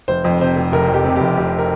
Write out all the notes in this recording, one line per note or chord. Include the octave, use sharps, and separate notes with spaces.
F1 C5
F2
C3 C5
F1
F1 A#4
F2
G4
C3
F1 G4
F1 G4
A#4